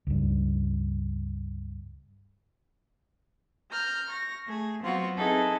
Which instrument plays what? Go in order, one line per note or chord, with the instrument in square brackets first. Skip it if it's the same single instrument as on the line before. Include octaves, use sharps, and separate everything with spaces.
[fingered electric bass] C#2 G2
[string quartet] A#5 F6 G6
C#6 A#6
A3 G#4
F#3 B3 C4 F4 F#4
C4 D#4 E4 G#4 A4 B4